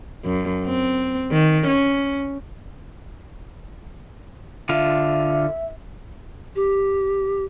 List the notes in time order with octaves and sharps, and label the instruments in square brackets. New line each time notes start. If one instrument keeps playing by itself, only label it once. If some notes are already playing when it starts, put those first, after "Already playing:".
[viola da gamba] F#2
C4
D#3
C#4
[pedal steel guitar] D3 F4 [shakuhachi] E5
[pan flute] G4